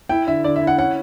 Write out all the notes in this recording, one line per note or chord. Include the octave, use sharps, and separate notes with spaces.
E4 G5
D3 E5
D3 D5
E5
E4
F#5
C#4 F#5